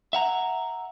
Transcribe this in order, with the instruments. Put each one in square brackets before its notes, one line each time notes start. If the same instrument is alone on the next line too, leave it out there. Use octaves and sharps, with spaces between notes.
[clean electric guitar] E5 F#5 A#5